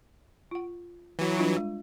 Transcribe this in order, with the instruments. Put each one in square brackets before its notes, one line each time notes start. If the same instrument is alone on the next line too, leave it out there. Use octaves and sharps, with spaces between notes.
[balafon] F4 F#5
[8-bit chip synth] E3 F#3
[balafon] G3 D4 F4
G#3